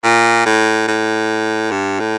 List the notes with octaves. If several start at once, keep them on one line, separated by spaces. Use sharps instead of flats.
A#2
A2
A2
G2
A2